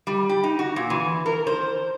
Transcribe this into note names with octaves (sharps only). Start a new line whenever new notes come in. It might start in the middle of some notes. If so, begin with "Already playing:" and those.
G3
G4
D#4
F#4
A#2
E3
A#4
C5